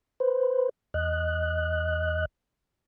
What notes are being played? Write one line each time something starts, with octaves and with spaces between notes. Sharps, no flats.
B4 C5
E2 D#5 F#6